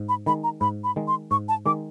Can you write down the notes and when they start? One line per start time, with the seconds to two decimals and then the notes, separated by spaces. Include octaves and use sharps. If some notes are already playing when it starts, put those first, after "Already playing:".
Already playing: G#2
0.09 B5
0.26 D#3 G#3 B5
0.43 A#5
0.61 G#2 B5
0.84 B5
0.96 D#3 G#3
1.08 C6
1.31 G#2 C#6
1.48 A5
1.66 D#3 G#3 D6